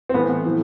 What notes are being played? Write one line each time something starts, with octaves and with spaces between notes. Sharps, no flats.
C4
A2 E3 B3
A2 F#3